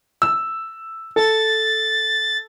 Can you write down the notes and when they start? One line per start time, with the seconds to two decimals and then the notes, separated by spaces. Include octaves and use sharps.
0.22 E6
1.16 A4 A6